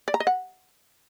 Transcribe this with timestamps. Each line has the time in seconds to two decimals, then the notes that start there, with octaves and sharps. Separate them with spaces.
0.08 D5
0.14 A#5
0.20 D#5
0.27 F#5